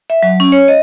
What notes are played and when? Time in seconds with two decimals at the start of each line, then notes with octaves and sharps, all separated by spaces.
0.10 E5
0.23 F#3
0.40 C#4
0.52 C#5
0.68 D#5